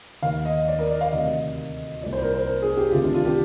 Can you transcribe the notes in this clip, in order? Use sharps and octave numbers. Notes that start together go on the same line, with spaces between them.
D#2 D#3 F5
D#5
D5
A#4
D5
F5
D2 C3 D#3 D#5
C2 A#2 D5
C5
A#4
C5
A#4
G#4
G4
D2 C3 D#3 F4
D4
F4
G4